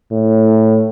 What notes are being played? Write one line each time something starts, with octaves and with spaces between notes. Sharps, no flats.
A2